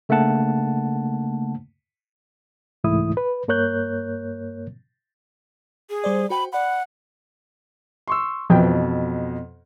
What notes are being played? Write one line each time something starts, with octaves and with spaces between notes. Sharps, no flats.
C#3 A3 A#3 D4 F#5 A5
C2 G#2 E3 A3 E4 D#6
B4
G2 A#3 A#4 C#5 F#6 G6
G#4
G3 C5 D5
F#4 C5 G5 B5
D5 F#5 B5
C6 C#6 E6
F2 B2 E3 F3 G5